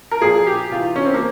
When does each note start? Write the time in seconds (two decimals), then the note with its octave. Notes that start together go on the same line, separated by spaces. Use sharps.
0.11 A#4
0.22 A#2 F3 G#4
0.47 G4
0.72 C3 E3 F4
0.96 C#4
1.05 C4
1.14 A#3